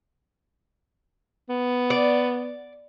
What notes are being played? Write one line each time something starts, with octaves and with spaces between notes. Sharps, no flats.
B3
D5